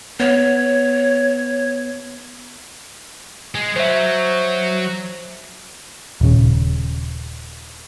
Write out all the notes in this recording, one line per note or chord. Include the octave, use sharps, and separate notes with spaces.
B3 C#5
G#3
F#3 C5 E5
D#1 C#3